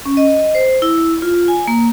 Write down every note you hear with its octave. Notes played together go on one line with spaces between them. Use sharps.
C#4
D#5
C5
E4
F4
G#5
A#3